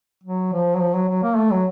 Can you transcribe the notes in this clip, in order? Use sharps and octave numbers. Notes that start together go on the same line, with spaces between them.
F#3
F3
F#3
F3
F#3
F#3
A#3
A3
F#3